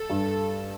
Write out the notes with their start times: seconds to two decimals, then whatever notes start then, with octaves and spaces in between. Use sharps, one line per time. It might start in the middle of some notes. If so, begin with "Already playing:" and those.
Already playing: A4
0.10 G2